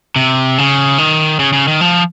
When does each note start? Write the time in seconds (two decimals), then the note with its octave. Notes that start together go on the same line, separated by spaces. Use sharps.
0.16 C3
0.58 C#3
0.98 D#3
1.39 C#3
1.53 C#3
1.68 D#3
1.81 F3